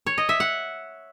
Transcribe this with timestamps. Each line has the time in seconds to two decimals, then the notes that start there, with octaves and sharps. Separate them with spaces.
0.06 C#5
0.18 D#5
0.29 E5
0.40 F#5